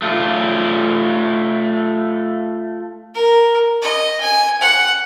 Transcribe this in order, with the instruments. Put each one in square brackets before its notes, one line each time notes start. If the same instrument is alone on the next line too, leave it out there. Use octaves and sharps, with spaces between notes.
[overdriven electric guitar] A3 F4
[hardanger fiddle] A#4
D#5
G#5
F#5